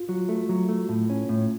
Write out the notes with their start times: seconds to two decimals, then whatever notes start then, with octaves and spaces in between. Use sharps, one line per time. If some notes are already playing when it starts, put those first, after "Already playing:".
Already playing: F4
0.09 F#3
0.29 A3
0.49 F#3
0.69 A3
0.89 A2
1.10 C#4
1.29 A2